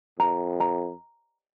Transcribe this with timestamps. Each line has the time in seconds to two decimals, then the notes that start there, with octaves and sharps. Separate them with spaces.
0.19 F2 A#5
0.60 A#5